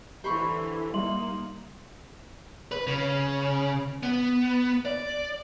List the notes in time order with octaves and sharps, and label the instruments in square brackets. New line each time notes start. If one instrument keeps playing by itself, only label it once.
[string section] D3 E3 [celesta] G4 [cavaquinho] C5 B5 C#6
[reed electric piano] G3 [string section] A#3 D#4 [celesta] E5 C6 F#7
[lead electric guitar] B4
C#3
B3
D5